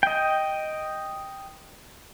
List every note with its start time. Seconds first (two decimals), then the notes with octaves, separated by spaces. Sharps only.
0.03 D#5 G5